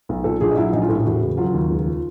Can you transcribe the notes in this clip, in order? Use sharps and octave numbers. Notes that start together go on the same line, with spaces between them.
B1
A#2 A4
A#1 G#4
D#4
F#3 E4
A#1 D#4
F4
A2 A4
G4
E1 F#4
C#3
F#3 F4
D#2
C#2
F3